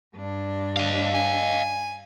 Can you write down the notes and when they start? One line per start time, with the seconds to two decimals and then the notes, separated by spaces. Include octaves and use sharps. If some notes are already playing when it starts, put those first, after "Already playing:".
0.16 G2 D4
0.77 D#5 F5
1.15 G#5